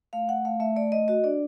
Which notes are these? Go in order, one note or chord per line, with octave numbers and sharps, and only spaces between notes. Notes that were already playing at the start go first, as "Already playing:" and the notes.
A3 F5
A3 F#5
A3 F5
A3 E5
A3 D5
A3 D#5
F#4 D#5
D4 D5